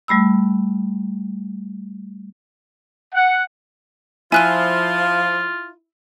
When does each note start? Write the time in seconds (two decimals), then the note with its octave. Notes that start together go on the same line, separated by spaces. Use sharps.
0.08 G3 A3 B5 E6
3.13 F#5
4.32 F3 E4 F4 G#5 F#6 D#7